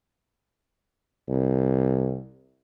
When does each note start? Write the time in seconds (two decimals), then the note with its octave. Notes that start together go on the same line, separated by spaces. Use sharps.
1.29 C2